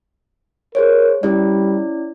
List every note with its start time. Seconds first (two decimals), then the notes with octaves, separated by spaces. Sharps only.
0.75 G#4 A#4 C5 C#5
1.23 G3 C#4 E4 D5